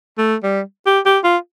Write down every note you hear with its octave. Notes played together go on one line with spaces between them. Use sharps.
A3
G3
G4
G4
F4